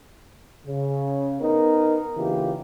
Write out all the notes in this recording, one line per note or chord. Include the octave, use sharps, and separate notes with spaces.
C#3
B3 D#4 A#4
C#3 E3 A#3 F4 G4